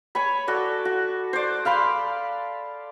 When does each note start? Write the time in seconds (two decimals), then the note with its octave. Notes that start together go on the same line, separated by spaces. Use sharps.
0.15 C#5 G#5 B5
0.47 F#4 A4 D5
0.85 F#4
1.33 C5 D5
1.65 F5 A5 B5 C6